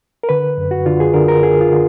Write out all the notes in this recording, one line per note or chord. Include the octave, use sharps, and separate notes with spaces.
A#4
D3 B4
F#2
F#4
D3 F4
G#4
D3 A#4
A#4
D3 G#4
F4
D3